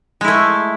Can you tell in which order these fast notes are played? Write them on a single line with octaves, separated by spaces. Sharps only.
G#3 E4 A3